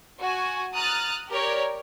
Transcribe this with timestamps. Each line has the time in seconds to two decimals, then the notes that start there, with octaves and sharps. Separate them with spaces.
0.20 F#4 G#5
0.73 A#5 D#6 F6 F#6 A6
1.30 G4 A#4 C#5 D5